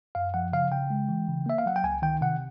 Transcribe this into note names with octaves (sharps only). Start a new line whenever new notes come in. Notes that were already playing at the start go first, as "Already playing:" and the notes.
F#2 F5
F3 F#5
C#3 F5
C#3 G5
G#3
E3
C#3
A#3 E5
F5
F#3 F#5
G5
C#2 G#5
D#3 G5
C3 F#5